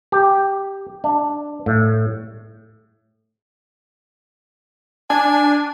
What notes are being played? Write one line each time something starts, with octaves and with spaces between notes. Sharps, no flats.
G4
D4
A2
D4 G#5